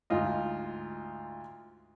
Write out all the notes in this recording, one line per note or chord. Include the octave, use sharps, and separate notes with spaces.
D2 G#2 F4 D#5